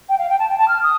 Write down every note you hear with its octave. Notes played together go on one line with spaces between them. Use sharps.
G5
F5
G5
A5
G5
A5
F6
D#6